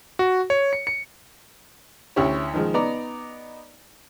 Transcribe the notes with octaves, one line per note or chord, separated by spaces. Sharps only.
F#4
C#5
C#7
C#7
D2 C#4 E4 G4 C#5
D#3 F3 G#3
B3 D#4 D5 A#5